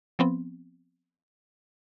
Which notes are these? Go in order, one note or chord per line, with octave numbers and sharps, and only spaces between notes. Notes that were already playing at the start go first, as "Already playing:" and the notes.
F3 B3 C4